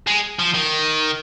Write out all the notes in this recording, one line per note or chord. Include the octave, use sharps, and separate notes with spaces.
G#3
F3
D#3